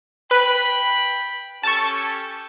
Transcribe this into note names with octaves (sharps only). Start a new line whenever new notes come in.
B4 G5 B5
C#4 G4 A4 A5 C#6